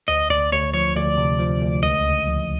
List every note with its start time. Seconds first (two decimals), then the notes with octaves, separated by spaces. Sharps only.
0.08 D2 D#5
0.30 D2 D5
0.52 D2 C#5
0.74 F3 C#5
0.96 D2 D5
1.17 C3
1.39 F3
1.61 D2
1.83 C#2 D#5
2.06 C#3
2.27 F3